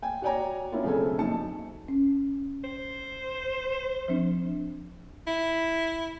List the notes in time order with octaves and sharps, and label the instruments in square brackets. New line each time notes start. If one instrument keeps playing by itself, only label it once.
[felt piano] G5 G#5
F#4 C#5 D5 G5 G#5 A#5
B3 C#4 D4 E4 F4 A#4
B1 C#3 A3 C4 A4 G#5
A#1 F#2 D#4 A5 C#7
[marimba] C#4
[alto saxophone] C5
[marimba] F3 C4 D4
[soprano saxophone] E4